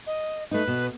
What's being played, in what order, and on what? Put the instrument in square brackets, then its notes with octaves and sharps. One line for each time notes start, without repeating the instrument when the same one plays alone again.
[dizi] D#5
[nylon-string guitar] A3 D#4 [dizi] B4
[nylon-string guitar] B2